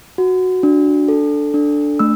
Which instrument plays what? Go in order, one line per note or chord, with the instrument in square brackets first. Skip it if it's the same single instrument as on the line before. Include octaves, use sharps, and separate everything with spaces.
[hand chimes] F#4
D4
A4
D4
A3 E6